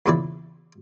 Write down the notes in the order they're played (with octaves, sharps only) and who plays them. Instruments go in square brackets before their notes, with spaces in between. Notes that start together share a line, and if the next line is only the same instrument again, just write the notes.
[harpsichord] E2 A#2 C#3 E3 E4 D5